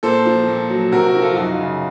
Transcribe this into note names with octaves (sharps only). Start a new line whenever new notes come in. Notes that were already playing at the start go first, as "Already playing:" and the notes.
A#2 A4 C5
F3
A#2
F#3
C3 F#4 A#4
F#4 A#4
F3
F4 A4
F#2 D#4 F#4
F4
C#3